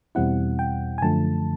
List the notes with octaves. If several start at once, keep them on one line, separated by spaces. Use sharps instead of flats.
E2 B2 G3 C4 E4 F#5
G5
G#5
F#2 D3 F3 A3 A5